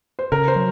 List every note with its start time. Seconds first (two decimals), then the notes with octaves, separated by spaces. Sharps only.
0.19 C5
0.32 C#3 A#4
0.48 C5
0.56 F#3